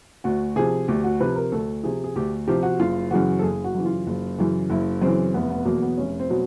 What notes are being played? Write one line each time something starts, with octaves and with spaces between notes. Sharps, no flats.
D2 F#4
C3 F3 G#4
D2 G4
F#4
C3 F3 B4
A#4
D2 A4
C3 F3 G#4
G#4
D2 G4
C3 F3 G4
F#4
F#1 F4
F#2 C#3 E3 F#4
A4
F#1 G#4
F#4
F#2 C#3 E3
F4
F#1
F#2 C#3 E3
F#1 E4
F#2 C#3 E3 C4
F1 B3
B3
E2 B2 F#3 A#3
B3
F1 C#4
C4
B2 F#3